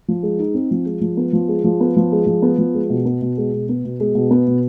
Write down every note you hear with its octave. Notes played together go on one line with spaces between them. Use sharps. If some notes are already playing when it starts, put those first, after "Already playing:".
F3
G#3
D#4
C4
F3
G#3
F3
B3
F3
G#3
F3
B3
F3
G#3
F3
B3
F3
G#3
B2
B3
B2
G#3
B2
B3
B2
G#3
B2
B3
B2